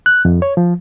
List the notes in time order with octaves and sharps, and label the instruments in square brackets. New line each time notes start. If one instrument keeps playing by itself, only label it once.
[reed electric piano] F#6
F2
C#5
F3